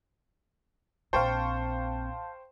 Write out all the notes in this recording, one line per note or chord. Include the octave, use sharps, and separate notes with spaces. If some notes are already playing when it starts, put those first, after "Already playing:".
A#1 C4 C5 F5 G5 A5 C#6